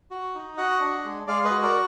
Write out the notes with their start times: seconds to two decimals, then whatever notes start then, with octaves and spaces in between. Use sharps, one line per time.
0.11 F#4
0.35 D#4
0.57 F#4 D#5 F#5
0.80 D4
1.05 G#3
1.27 G#3 D5 F5
1.45 B4 D#5
1.51 F#4
1.62 A#4 D5